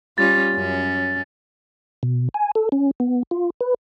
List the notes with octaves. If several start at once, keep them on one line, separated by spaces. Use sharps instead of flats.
G3 C#4 F4 A6
F#2 C#4
B2
G#5
A4
C#4
B3
F4
B4